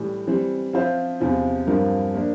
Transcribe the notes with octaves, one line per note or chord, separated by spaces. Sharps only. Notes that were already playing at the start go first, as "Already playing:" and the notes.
Already playing: A2 E3 G3
E3 G3 C4
F3 C4 F4 C5 E5
E2 C3 F3 C4 F4
G2 F3 C4 F4 A#4
F3 A#3 D4